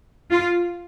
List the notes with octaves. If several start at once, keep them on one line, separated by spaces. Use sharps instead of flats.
F4